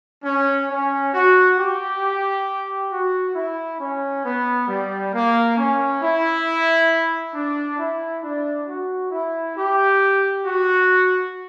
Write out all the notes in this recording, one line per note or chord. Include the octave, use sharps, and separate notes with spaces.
C#4
C#4
F#4
G4
F#4
E4
C#4
B3
G3
A#3
C#4
E4
D4
E4
D4
F#4
E4
G4
F#4